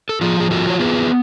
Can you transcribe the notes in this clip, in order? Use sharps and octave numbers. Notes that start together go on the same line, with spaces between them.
A4
F3 F4 G#4
G#4
F4 F#4 A4
C#5
B3 G#4 B4